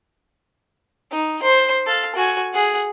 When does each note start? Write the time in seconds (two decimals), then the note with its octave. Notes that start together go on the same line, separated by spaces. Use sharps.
1.12 D#4
1.43 C5
1.87 A4 F5
2.16 F#4 G#5
2.53 G#4 F#5